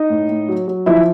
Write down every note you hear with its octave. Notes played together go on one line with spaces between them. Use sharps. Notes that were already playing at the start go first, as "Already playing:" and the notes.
Already playing: D#4 D#5
A2
A2
F#3
F#3
F3 E4 E5